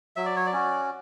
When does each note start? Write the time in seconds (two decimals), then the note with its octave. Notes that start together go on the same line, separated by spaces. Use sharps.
0.16 F#3 E5
0.26 D5
0.36 C#5
0.46 D5
0.53 C#4 F#4